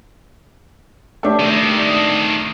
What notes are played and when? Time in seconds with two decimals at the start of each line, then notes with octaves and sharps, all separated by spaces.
1.23 A3 D4 G4
1.40 D#3 C4